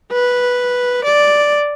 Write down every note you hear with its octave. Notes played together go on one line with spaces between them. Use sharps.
B4
D5